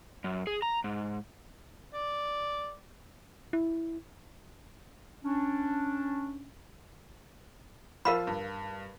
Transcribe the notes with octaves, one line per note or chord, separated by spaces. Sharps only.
F#2
G#4
A#5
G#2
D5
E4
C#4 D4
F3 F4 A#4 F5 B5
G2